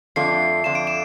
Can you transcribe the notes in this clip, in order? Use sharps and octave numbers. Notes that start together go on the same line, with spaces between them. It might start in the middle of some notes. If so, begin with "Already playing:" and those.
F2 D3 A3 D4 F4 C7
F2 D3 A3 D4 F4 E7
D7
E7